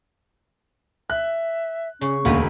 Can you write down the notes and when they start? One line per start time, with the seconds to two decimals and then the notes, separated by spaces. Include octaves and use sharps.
1.10 E5 F#6
2.01 C#3 C#4 C#6
2.25 E1 D2 A#3 B3 D#4